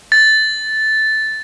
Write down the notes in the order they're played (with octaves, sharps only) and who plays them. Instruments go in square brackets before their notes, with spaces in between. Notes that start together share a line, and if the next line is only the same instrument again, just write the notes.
[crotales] A6